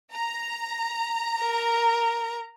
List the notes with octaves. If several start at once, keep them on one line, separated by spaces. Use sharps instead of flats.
A#5
A#4